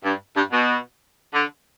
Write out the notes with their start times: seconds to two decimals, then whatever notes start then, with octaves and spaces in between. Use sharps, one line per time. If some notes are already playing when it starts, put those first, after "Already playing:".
0.04 G2
0.36 G2
0.52 B2
1.34 D3